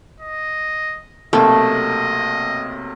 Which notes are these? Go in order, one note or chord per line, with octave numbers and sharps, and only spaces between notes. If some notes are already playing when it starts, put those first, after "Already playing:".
D#5
B1 C3 A3 A#3 D#5